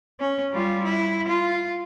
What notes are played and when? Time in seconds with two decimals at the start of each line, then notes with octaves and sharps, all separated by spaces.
0.20 C#4
0.52 G3 F4
0.84 E4
1.28 F4